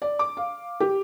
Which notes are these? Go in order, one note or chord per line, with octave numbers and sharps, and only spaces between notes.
D5
D6
F5
G4